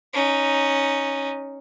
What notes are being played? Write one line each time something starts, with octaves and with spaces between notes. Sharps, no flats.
C#4 D#4